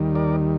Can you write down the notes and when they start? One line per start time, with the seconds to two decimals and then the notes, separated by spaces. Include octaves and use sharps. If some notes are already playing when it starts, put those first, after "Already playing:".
Already playing: D#2 D#3 G3
0.15 A#4 D5